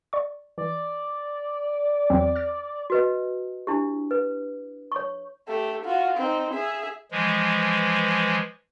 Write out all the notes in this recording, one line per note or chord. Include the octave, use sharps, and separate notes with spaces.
D5 C#6
E3 D5
E2 F#3 C4
F6 A6
F#4 B4 D#5
D4 E4 G4
B4
C#5 C#6
A3 G4
F4 F#4
C4 D#4
G#4 E5
E3 F3 G#3